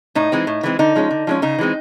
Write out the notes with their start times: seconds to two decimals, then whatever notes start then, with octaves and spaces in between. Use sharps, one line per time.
0.15 A2 D#4
0.32 E3 G#3 C4
0.47 A2
0.63 E3 G#3 C4
0.79 D3 D#4
0.95 F3 G#3 C#4
1.11 D3
1.27 F3 G#3 C#4
1.42 C#3 D#4
1.58 E3 G#3 C4